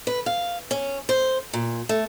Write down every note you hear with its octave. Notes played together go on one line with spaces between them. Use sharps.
B4
F5
C#4
C5
A#2
A3